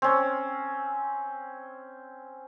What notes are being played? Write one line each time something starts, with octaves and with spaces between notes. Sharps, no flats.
C4 C#4